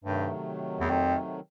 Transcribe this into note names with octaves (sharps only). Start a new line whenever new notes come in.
G2 C3 D#3 F#3 A3
E2
F2